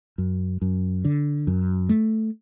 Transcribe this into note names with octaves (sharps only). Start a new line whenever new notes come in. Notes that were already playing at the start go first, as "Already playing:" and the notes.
F#2
F#2
D3
F#2
A3